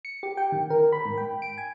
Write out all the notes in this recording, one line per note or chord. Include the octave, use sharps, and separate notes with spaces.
C#7
G4
G5
D#3
A#4
B5
G#2
G5
D7
G#5